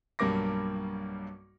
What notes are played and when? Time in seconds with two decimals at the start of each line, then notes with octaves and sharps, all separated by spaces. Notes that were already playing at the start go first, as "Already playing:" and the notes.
0.19 B1 G2 G3 A#3 D6 A#6